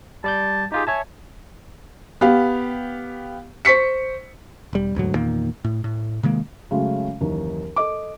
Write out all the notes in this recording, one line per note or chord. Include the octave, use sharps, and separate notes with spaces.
G3 D5 A5 G6
D#4 F4 G4 G#4
C#5 E5 G#5 A5
B3 G4 F5
C5 C#6 B6 C#7
E1 G3
E1 D2 G#2 F#3
E2 A#2 D#3 A#3
A2
A2
C3 D#3 G#3 A#3
C#3 F#3 G#3 A3
F#1 D#2 E3 D#4
A4 D#5 D6